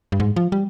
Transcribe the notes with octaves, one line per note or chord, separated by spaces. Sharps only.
G2
G#2
F3
G3